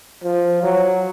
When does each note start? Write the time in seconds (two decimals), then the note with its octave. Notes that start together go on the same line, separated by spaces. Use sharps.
0.24 F3
0.63 F#3